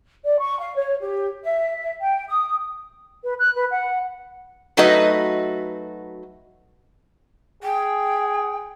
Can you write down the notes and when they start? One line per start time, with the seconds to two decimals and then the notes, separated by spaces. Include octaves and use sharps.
0.23 D5
0.39 C#6
0.59 F5
0.75 C#5
1.00 G4
1.43 E5
2.01 G5
2.27 D#6
3.24 B4
3.39 F#6
3.56 B4
3.71 F#5
4.77 F#3 A3 D#4 F#4 B4 D#5
7.63 G#4 G5